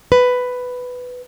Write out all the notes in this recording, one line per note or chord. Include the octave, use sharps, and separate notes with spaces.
B4